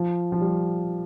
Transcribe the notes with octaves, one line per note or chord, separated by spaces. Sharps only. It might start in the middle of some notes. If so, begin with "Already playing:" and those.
Already playing: F3
F3
G3